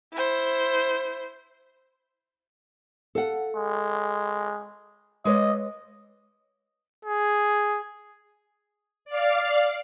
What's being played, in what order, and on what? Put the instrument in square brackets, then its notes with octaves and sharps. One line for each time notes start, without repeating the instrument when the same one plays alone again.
[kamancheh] E4 C5
[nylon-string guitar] A4 F5 F#5
[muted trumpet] G#3
[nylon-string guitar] G#3 B4 C#5 [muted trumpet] D#5
[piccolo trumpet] G#4
[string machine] D5 F5